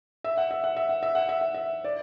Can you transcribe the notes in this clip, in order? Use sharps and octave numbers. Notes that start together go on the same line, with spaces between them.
E5
F#5
E5
F#5
E5
F#5
E5
F#5
E5
F#5
E5
D5